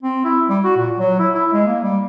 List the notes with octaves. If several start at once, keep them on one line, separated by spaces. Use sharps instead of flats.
C4
E4
G3
F#4
A#2
F#3
E4
E4
G#3
A#3
G3